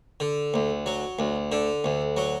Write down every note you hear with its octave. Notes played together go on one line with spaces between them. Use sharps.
D3
D2
F#3
D2
D3
D2
F#3